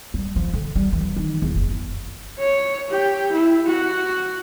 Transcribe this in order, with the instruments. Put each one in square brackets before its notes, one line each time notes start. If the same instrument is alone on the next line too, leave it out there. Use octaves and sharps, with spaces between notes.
[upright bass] G3
F3
D3
G3
E3
D#3
E2
F#1
[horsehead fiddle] C#5
G4
E4
F#4